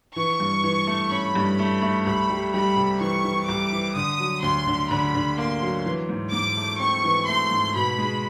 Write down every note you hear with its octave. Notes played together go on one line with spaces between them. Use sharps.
E3 C#6
G2
E3
A3
C#4 B5
G2
A3
A3
C2 B5
G3
G3 B5
C3
E3 C#6
E3
C2 D6
E3
D3 D#6
F#3
D2 C6
D3
D3 B5
D3
A#3 C6
F#3
E3
G#2
G#2 D6
A3
C4 C#6
E3
A3 C6
G#2
B2 B5
G#3